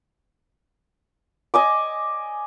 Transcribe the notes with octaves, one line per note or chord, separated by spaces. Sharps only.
D#5 G#5 D6